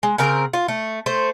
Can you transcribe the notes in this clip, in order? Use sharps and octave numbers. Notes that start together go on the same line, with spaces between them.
G#3
C#3 C4 A#4 A#5
F4
A3
A3 C5